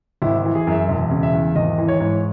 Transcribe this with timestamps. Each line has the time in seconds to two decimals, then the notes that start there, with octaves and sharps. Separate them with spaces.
0.22 G#1 E4
0.45 E3
0.55 G#4
0.67 F#2 E5
0.89 E1
1.11 C#3
1.23 E5
1.33 E2
1.55 G#1 D#5
1.78 E3
1.88 C#5
2.00 G#2